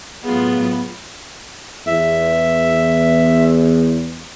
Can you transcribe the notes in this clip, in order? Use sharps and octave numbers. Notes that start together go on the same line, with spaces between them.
A2 F#3 B3 F4 G#4
E2 E5